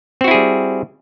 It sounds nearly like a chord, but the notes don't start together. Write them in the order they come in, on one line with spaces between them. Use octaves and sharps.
C4 F#4 E4 G#4 G3